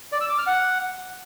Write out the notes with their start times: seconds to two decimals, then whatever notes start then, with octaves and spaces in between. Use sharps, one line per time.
0.12 D5
0.21 E6
0.29 D6
0.38 F6
0.47 F#5